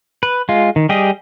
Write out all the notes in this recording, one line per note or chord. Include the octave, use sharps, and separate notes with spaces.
B4
G#3 F4
D#3
G3 G4 G#4 D#5